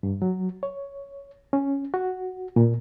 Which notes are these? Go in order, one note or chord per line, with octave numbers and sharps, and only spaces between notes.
G2
F#3
C#5
C#4
F#4
A#2